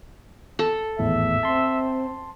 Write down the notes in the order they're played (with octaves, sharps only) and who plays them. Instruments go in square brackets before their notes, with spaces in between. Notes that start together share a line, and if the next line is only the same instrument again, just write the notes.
[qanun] A4
[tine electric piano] G#1 E2 A2 [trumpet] E5
[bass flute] C4 [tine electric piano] A5 C6